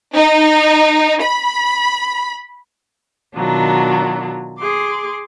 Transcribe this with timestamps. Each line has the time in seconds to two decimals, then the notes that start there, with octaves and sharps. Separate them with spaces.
0.14 D#4
1.23 B5
3.36 B2 D#3 F#3 D4 F4
4.58 G#4 C6 D6